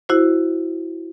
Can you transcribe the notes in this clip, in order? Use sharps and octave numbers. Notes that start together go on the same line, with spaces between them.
E4 F#4 C5